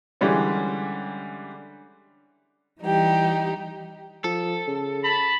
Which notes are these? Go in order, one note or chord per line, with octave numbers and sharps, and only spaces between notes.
D3 E3 G3 G#3 C#4
E3 G3 D#4 G4
F3 A4
C#3
A5 B5